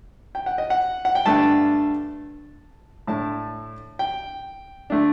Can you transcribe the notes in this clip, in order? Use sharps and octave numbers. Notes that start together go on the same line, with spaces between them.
G5
F#5
D#5
F#5
F#5
G5
G2 D3 A3 D4 A5
A2 A3 D4 A5
G5
D3 A3 D4